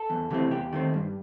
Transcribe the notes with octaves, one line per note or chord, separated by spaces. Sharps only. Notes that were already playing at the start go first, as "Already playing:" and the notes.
Already playing: A4
E2
C3 E3 A3 C4
E2 G4
D#3 A3 C4
G2